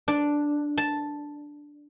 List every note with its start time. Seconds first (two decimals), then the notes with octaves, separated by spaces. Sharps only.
0.08 D4
0.78 A5